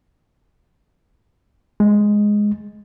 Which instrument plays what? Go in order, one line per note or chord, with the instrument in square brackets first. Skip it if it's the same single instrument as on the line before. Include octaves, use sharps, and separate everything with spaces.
[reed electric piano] G#3